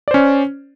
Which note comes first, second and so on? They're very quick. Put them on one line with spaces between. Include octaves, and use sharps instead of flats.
D5 C5 C#4